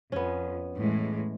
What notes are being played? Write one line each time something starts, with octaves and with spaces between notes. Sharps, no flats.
F2 B3 C#4
A2 E3 G#3